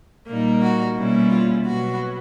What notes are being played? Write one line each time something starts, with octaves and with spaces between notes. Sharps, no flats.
A#2 G3 A#3 D#4
F#4
B2 G3 A#3 C#4 E4
F4
B2 F#3 B3 F#4